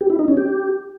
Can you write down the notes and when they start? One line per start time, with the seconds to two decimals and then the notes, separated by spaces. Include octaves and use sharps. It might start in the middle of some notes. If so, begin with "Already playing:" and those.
0.01 G4
0.10 E4
0.19 D#4
0.28 C#4
0.37 G4